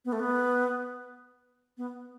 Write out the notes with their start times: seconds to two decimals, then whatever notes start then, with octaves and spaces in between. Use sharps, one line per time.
0.05 B3
0.12 A3
0.19 B3
1.77 B3